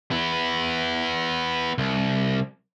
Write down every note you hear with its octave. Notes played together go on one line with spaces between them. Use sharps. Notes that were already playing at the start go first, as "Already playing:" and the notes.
B3 E4
C2